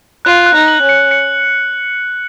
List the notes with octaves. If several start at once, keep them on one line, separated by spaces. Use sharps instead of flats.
F4 F#6
F#6
D#4
F#7
C#4
C#7
C#7